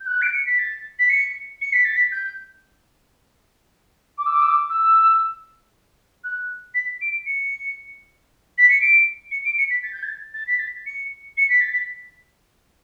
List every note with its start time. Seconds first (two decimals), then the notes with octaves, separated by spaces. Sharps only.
0.01 G6
0.07 F#6
0.22 D7
0.34 C#7
0.46 B6
0.59 A6
0.99 B6
1.09 C#7
1.61 C#7
1.73 B6
1.85 A6
1.96 B6
2.12 G6
4.18 D6
4.26 E6
4.34 D6
4.42 E6
4.50 D6
4.69 E6
6.24 F#6
6.74 B6
7.01 D7
7.26 C#7
8.58 B6
8.70 C#7
8.81 D7
9.31 C#7
9.45 D7
9.58 C#7
9.70 B6
9.83 A6
9.93 G6
10.03 A6
10.34 A6
10.47 B6
10.59 A6
10.86 C#7
11.37 C#7
11.49 B6
11.61 A6
11.73 B6